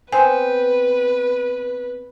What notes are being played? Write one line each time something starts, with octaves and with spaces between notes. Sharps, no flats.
B3 C4 B4 C5 G#5